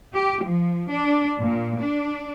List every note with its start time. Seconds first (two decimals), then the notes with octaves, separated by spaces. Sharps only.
0.12 G4
0.44 F3
0.91 D4
1.41 A#2
1.80 D4